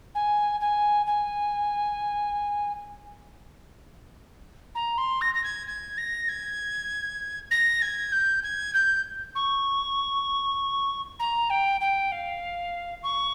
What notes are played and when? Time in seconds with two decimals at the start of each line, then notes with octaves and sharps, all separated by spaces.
0.15 G#5
0.60 G#5
1.06 G#5
4.75 A#5
4.97 C6
5.21 A#6
5.34 A#6
5.43 G#6
5.67 G#6
5.97 A#6
6.28 G#6
7.51 A#6
7.81 G#6
8.12 G6
8.43 G#6
8.74 G6
9.35 C#6
11.19 A#5
11.50 G5
11.81 G5
12.12 F5
13.03 C#6